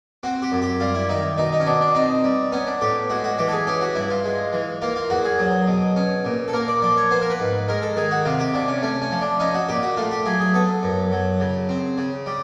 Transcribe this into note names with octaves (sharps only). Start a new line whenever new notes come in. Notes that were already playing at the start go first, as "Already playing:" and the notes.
C4 F#4
G4
F#2
G4
G3 F4
E4
D#3 D#4
B2 D#4
D#4
C#4
B2 D4
D4
C4 D#4
G3
B3 C#4
D4
A2 G4
G#3 F#4
F#4
E3 G4
A4
G#4
C#4 G4
F#4
G2 E4
F4
G#3
E3
A#3 F4
F4
E2 F#4
G#4
F#3
B2
C#4
A#2
A4
A#3 A#4
D5
F3 D5
C#5
B3 C5
A#4
B4
G#2
G#3 A#4
A4
D#3 G#4
F#4
C3 F4
G4
C3 D4
C#4
A3 C#4
C#4
F3
D4
C#4 D#4
F#4
A#2 G4
F#4
A3 F4
G4
F#3 G#4
G#4
B3 A4
F#2
F#3
C#3
C4
C#3
G3